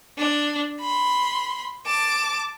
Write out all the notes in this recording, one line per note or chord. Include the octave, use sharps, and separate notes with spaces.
D4
B5 C6
A5 D6